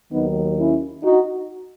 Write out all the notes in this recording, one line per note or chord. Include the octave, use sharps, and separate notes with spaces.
D#2 D#3 F#3 B3 D#4
C#4 E4
D#4 F#4